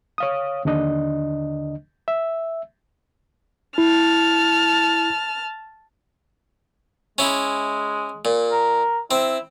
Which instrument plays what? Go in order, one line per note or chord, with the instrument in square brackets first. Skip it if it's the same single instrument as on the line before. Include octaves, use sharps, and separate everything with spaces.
[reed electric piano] C#5 F5 D#6
D#2 D3 D4 D#5
E5
[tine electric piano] E4 [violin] A5 F6
[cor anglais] G#3 [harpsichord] C#4 E4
[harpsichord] A#2
[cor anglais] A#4
[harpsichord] C4 [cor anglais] E4